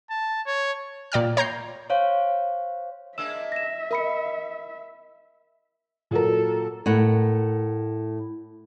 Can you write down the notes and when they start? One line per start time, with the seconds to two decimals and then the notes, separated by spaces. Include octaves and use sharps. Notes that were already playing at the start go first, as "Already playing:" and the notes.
0.10 A5
0.46 C#5
1.12 A#2 D5 G5 F6
1.37 C#5 A#5 G6 C7
1.90 C5 C#5 F5
3.18 G#3 A#3 D4 E5 E6 E7
3.52 A#6 E7
3.91 A#4 D#5 B5 C#7
6.11 A#2 F#3 A4 A#4
6.86 A2 A#4 F#5